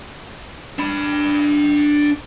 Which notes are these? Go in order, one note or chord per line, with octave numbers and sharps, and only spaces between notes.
D4 B5